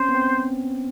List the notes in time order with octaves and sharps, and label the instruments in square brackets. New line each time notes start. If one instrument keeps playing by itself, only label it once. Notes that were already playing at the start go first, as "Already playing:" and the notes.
Already playing: [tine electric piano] C4 C#4 [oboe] C5
[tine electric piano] B3
C4